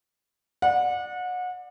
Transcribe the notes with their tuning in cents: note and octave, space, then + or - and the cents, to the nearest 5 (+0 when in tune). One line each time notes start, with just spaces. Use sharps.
D5 +20 F#5 -30